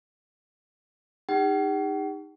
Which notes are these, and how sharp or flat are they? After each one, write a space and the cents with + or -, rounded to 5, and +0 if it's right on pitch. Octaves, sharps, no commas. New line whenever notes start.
D#4 +0 G4 +45 F#5 +45